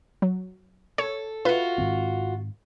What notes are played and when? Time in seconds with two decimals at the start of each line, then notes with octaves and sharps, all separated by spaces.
0.22 F#3
0.98 A4 C#5
1.45 F4 F#4 B4
1.78 G#2 D#3 C4